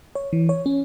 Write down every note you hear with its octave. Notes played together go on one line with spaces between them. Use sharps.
C#5
E3
C#5
C#4